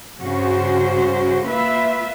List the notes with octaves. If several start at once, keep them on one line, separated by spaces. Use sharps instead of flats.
G2 C#3 F#4 C5
A#3 F4 B4 E5